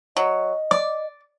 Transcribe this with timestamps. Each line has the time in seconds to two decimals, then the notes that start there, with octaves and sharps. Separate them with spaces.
0.17 F#3 D#5
0.71 D5 D6